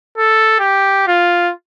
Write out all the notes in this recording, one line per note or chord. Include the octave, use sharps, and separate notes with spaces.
A4
G4
F4